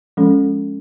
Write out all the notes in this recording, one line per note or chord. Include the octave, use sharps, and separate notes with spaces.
F3 G#3 C#4 A4